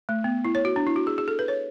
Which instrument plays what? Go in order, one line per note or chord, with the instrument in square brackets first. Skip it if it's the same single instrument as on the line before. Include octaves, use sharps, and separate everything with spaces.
[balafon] A3
B3
E4
C#5
F#4
D4
E4
F#4
G#4
G#4
A4
B4
C#5